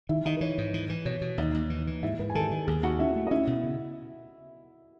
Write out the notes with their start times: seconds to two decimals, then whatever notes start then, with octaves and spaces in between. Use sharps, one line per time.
0.09 D#3 E4 E5
0.25 D#3 D#4 D#5
0.37 B4
0.41 E3 C#5
0.58 G#2
0.74 E3
0.89 E3
1.05 B2 C#5
1.21 B2
1.38 D#2 D#4 D#5
1.54 D#2
1.70 E3
1.87 E3
2.03 G#2 E4 E5
2.19 G#2 B4
2.30 G#5
2.35 D#3 A4 A5
2.51 D#3
2.67 D#2 G#4 G#5
2.83 D#2 F#4 F#5
2.99 C#4 E4 E5
3.16 A3
3.27 D#5
3.31 C#4 E4 E5
3.47 B2
3.63 C#3